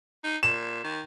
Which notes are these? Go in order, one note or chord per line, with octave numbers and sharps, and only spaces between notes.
D#4
A#2 E7
D#3